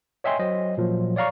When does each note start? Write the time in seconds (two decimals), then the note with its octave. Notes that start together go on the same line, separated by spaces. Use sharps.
0.24 C#5 D#5 E5 G5 G#5 C6
0.39 F#3 C5 D#5
0.77 A#2 F3 F#3
1.16 C#5 D5 F5 A#5 C#6